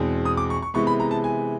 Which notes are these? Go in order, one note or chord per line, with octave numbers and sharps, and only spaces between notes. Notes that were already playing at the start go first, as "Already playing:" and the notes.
Already playing: E2 B2 G#3 C4
D#6
D6
C#6
C#6
C3 E3 G#3 B3 C#6
B5
A#5
A5
G#5